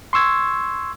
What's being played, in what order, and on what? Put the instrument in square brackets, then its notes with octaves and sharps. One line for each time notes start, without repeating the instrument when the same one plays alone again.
[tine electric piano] C6 C#6 E6 G#6